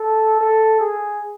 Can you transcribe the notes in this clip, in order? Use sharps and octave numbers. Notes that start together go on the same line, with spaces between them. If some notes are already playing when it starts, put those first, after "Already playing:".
Already playing: A4
A4
G#4